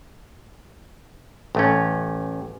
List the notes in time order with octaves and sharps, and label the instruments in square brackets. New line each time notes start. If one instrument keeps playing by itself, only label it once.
[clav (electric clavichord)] A1 A3 C#4